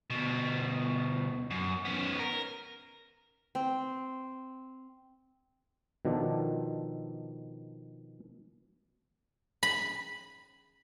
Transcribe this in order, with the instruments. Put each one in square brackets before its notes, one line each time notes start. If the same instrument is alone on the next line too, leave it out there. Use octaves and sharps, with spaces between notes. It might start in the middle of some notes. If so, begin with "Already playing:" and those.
[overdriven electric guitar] D2 B2
F#2
B3 C#4
A#4
[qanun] C4
[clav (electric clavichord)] B2 D#3 F3 D4 A4
[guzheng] B5